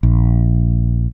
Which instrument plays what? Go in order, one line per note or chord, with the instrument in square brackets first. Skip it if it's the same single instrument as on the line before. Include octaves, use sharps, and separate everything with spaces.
[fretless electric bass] A#1